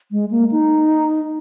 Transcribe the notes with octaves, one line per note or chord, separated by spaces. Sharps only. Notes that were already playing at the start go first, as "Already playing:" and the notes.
G#3
A#3
D#4